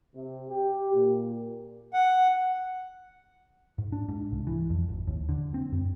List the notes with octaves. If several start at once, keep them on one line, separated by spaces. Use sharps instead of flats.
C3
G4
A#2
F#5
G#2
D4
G#2
C2
E3
F2
G#1
D#2
D3
C4
F#2